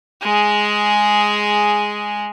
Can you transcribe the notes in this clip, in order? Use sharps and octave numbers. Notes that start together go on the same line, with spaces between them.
G#3 G#4